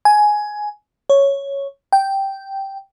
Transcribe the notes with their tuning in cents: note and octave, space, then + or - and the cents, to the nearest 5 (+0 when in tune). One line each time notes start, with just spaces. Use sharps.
G#5 +10
C#5 +0
G5 -5